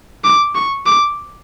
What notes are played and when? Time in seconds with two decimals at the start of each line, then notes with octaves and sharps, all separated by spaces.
0.24 D6
0.55 C#6
0.86 D6